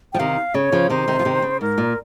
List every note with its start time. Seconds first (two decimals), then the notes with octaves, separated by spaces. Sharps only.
0.13 F3 G5
0.19 C3 D#3 F5
0.54 C#3 C#5
0.72 C#3 F3
0.90 C3 D#3 C5
1.08 C3 D#3
1.19 F3
1.25 C3 D#3
1.42 C#3
1.61 G#2 A#4
1.78 A#2